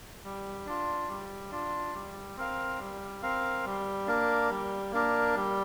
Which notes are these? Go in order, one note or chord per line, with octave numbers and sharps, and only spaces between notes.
G3
D4 F4
G3
D4 F4
G3
C4 A#4 F5
G3
C4 A#4 F5
G3
A#3 D4 A#4
G3
A#3 D4 A#4
G3